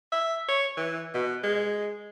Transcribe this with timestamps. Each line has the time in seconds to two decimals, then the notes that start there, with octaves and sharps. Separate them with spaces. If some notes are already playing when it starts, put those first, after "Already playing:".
0.12 E5
0.49 C#5
0.77 E3
1.14 B2
1.44 G#3